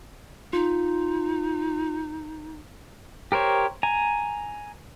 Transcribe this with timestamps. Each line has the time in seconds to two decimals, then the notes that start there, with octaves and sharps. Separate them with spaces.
0.53 D#4 F4
3.32 G4 A#4 C5 C#5
3.83 G#5 A#5